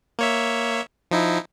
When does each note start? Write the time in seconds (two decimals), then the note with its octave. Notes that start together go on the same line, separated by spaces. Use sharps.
0.19 A#3 C#5 E5
1.11 F3 D#4 E4